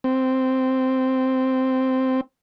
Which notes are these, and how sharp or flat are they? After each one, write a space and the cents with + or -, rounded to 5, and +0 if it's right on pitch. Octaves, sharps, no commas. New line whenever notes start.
C4 -5